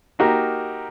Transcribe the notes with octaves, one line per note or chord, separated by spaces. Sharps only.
A#3 D#4 F#4 G4 A#4